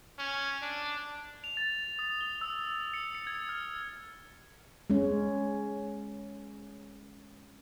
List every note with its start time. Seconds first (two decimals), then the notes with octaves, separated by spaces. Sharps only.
0.18 C#4
0.62 D4
1.44 F7
1.57 A6
1.99 D#6
2.21 G7
2.41 E6
2.94 C#7
3.15 C#7
3.27 G#6
3.49 F6
4.90 G#3 C#4